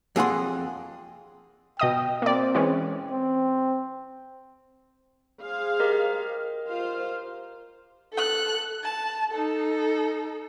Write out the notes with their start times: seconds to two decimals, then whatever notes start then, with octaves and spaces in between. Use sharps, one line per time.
0.16 F2 G#4 F#5 C6
1.79 B2 D#5 G5 D#6
2.22 A#3 C4 D5
2.55 E3 G#3 C#4
3.11 C4
5.44 G#4 C5 F5
5.80 G4 A#4 D#5
6.68 F4 C5 F5
8.13 A4 F#6
8.83 A5
9.31 D#4 A4